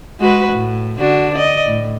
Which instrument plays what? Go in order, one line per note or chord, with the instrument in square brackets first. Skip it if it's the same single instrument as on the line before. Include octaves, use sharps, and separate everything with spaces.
[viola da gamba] G#3 F#4 B4
A2
D3 D4 F#4
D5 D#5
A2